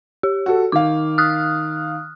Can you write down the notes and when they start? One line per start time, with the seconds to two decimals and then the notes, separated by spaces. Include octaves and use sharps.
0.23 G4
0.46 F#4 A4
0.72 D#3 F5 D6
1.18 D#6 F6 F#6